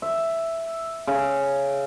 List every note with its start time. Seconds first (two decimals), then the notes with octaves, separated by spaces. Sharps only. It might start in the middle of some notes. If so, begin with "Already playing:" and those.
0.02 E5
1.07 C#3